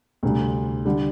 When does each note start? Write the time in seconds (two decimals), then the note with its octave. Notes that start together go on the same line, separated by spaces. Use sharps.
0.23 D2 C3 G3
0.86 D3 G3 D4